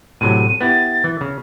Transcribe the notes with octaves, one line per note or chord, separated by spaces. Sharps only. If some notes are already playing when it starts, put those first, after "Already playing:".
A2 C3 F#3 D#7
B3 E4 G4 A6
E3
C#3